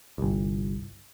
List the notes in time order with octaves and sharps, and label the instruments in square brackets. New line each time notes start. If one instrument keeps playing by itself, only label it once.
[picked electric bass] G1 C2